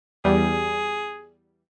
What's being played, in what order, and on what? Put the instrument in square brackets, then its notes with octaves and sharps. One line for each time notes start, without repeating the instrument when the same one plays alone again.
[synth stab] E2 G3 [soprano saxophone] G#4